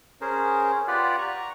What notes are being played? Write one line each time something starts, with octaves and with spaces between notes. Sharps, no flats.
C#4 G#4 A#4 C5
F4 G4 B4 D5 F#5
A#5 C#6